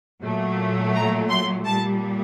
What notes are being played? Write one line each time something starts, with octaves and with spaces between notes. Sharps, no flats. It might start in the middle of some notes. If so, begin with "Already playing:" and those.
A#2 F#3 A3
A#5
C6
A#2 G3 A5